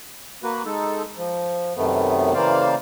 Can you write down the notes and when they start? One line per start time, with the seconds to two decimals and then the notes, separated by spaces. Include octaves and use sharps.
0.43 A#3 F#4 B4
0.65 G#3 D#4 A4
1.17 F3
1.76 F#2 C3 D#3 A3 B3
2.34 C#3 E3 A#3 C5 D5 F5